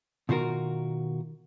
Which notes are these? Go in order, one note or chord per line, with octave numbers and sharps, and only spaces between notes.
B2 D#3 F4 F#4 A#4